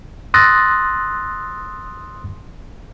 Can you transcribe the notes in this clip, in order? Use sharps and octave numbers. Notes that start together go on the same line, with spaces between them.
C6 D#6 E6 F#6 A6 A#6